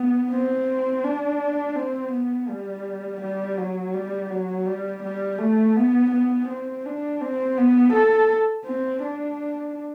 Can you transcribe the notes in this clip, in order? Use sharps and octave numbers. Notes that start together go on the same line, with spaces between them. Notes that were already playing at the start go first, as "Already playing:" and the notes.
Already playing: B3
C4
D4
C4
B3
G3
G3
F#3
G3
F#3
G3
G3
A3
B3
B3
C4
D4
C4
B3
A4
C4
D4